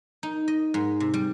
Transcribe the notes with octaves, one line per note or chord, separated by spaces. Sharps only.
D#4
D#5
G#2
C3
G3